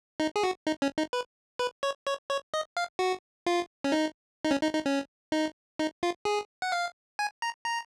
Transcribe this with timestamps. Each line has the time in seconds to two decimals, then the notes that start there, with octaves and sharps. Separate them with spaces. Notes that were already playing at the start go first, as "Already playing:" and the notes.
0.20 D#4
0.36 G#4
0.44 F#4
0.67 D#4
0.82 C#4
0.98 D#4
1.13 B4
1.59 B4
1.83 C#5
2.07 C#5
2.30 C#5
2.54 D#5
2.77 F5
2.99 F#4
3.46 F4
3.84 C#4
3.92 D#4
4.45 D#4
4.51 C#4
4.63 D#4
4.74 D#4
4.86 C#4
5.32 D#4
5.79 D#4
6.03 F4
6.25 G#4
6.62 F#5
6.72 F5
7.19 G#5
7.42 A#5
7.65 A#5